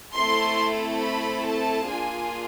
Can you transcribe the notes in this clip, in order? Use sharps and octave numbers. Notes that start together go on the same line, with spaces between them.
A3 C4 E4 A4 C6
B5
A5
A#3 D4 F4 G#4 G#5